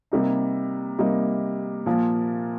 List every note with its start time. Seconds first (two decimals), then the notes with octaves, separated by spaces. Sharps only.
0.12 C3 G3 A#3 D#4
0.99 C3 G3 A#3 D#4
1.86 A#2 F3 A#3